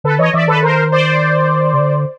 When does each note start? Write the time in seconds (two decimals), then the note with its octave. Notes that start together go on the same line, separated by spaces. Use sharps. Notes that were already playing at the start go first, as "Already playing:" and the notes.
0.04 D3 A4 B4
0.19 E3 C#5 D#5
0.34 E3 D5 E5
0.48 D#3 A4 B4
0.63 A#4 C5
0.92 C5 D5
1.74 C#3
1.80 D3